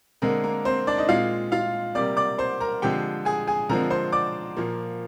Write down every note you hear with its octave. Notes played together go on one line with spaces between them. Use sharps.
D3 G#3 A#3 C4 A#4
A#3 A#4
C4 C5
D4 D5
D#4 D#5
A#2 G#3 C4 F4 F5
F4 F5
C3 G3 A#3 D5 D6
D5 D6
C5 C6
A#4 A#5
D3 F3 G#3 C4 G4 G5
G#4 G#5
G#4 G#5
D3 F3 G#3 C4 A#4 A#5
C5 C6
D5 D6
A#2 F3 A#3